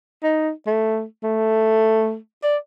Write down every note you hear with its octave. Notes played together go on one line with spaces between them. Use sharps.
D#4
A3
A3
D5